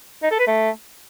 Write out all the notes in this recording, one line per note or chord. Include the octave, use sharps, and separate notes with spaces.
D#4
A4
B4
A3